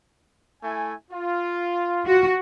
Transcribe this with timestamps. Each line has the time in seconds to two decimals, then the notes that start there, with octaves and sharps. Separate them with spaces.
0.63 A3 E4 G#5
1.11 F4
2.05 F4 F#4